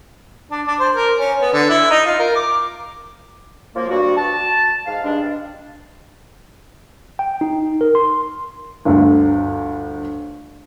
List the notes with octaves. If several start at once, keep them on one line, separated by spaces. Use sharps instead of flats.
D4
D4
C5
A#4
C#4
B3
D3
E4
D#4
F4
A#4
D6
F#2 F3 A#3
G2 G3 F#4
A5
G#2 F5
G2 G#3 D4
G5
D#4
A#4
C6
G1 D2